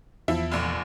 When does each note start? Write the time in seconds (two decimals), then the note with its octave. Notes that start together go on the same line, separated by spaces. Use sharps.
0.28 E2 F3 E4 E5
0.51 F1 A#1